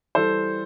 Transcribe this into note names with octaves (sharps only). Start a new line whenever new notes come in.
E3 G3 A4 C5